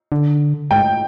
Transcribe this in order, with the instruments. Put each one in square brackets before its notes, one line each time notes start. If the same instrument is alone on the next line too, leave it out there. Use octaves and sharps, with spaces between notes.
[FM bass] D3
[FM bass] G#2 [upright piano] G5